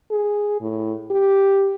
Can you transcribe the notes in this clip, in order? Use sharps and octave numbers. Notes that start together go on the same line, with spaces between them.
G#4
A2
G4